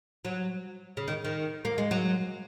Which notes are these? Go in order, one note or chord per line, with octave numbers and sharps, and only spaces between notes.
F#3
C#3
D#3
D#3
A#3
G#3
F#3